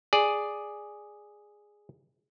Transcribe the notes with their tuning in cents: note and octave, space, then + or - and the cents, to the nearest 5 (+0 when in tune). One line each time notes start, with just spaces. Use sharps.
G#4 +0 D5 +0